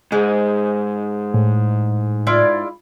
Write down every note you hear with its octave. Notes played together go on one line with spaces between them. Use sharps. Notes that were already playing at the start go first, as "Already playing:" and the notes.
G#2 G#3
A2
E4 F4 D5